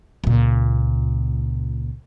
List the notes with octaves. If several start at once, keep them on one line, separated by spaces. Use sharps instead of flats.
C#2 A#2